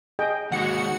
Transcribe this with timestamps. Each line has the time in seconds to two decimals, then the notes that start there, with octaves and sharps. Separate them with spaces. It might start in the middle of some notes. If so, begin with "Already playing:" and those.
0.19 G#4 D#5 G5
0.52 D#2 G#3 F#4 F#5 C#7